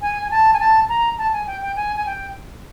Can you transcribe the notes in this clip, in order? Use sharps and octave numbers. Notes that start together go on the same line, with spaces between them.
G#5
G#5
A5
G#5
A5
A#5
A5
G#5
G5
G5
G#5
G#5
G5